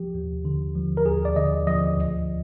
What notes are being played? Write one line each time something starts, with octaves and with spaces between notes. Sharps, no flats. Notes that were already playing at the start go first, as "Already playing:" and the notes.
Already playing: F3 G4
D#2
D3
F3
A#4
D#2 G#4
D5
D3 D#5
F3 D#5
D2